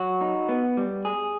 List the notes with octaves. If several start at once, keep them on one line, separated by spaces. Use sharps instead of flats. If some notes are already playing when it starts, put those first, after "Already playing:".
Already playing: F#3 F#4
D#4
B3
G3
G#4